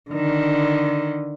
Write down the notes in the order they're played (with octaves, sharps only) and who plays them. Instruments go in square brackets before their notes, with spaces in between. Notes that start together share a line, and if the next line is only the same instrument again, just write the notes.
[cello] D3 D#3